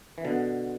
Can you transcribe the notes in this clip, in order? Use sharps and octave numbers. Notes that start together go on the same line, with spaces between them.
E3
B2 D3